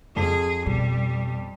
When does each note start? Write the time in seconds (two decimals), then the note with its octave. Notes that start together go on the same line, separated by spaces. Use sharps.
0.16 F2 G#4
0.66 B2 G3